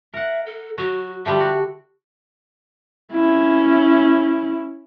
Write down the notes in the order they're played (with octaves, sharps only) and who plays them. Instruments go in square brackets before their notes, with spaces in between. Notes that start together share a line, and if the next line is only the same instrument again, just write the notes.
[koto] A#4 F#5 [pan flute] E5
[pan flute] A4
[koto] F#3 [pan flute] F#4
[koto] D3 F3 G3 [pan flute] E5
[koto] F#4
[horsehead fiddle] C#4 E4